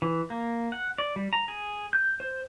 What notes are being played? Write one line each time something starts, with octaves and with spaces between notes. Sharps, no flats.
E3
A#3
F#5
D5
G3
A#5
G#4
G6
C5